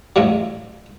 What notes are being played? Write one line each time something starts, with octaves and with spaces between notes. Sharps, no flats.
A1 F2 A2 F3 F#3